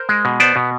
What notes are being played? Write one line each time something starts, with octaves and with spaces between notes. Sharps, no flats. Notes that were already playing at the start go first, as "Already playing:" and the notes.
Already playing: A#4 C5
G#3
B2
B3 C5 D5
B2